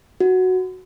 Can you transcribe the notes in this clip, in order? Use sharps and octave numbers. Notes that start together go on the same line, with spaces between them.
F#4